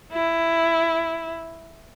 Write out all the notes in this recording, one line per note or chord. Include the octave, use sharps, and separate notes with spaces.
E4